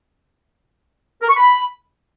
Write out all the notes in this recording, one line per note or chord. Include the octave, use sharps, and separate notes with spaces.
A#4
C#6
B5